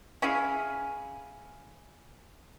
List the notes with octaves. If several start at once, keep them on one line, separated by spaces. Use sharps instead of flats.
C#4 E4 G#4 F5